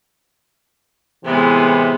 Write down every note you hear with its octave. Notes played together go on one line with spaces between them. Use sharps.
A2 C3 E3 G#3 B3